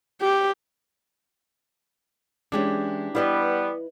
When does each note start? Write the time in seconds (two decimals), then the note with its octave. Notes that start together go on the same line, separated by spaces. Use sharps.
0.21 G4
2.52 E3 G#3 C#4 D4 G4
3.15 G3 B3 E4 B4 D#5